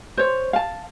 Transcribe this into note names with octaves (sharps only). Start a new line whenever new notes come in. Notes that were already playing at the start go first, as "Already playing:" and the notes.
C5 C#5
F5 A5